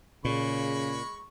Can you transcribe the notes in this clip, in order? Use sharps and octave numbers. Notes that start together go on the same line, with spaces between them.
A#2 C#3 G#3 B5 C#6